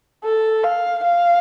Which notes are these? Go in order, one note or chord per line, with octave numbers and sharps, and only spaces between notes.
A4
F5
F5